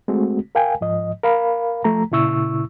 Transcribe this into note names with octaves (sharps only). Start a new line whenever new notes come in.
G#3 A3 C4 F#4
A#4 F5 G5 G#5
G#2 F3 D#5
A#4 F5 B5
F3 A3 A#5
A#2 C#3 E4 C#6 E6